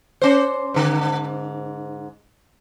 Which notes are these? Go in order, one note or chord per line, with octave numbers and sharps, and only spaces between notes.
C#4 C5
G#2 D3